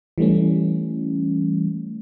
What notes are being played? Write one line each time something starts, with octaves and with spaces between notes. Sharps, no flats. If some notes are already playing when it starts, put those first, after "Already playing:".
E3 G3 A3 C#4